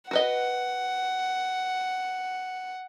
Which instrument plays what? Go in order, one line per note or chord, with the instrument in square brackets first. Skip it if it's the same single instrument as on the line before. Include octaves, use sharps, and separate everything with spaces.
[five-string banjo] F#4 B4 D#5 [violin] F#5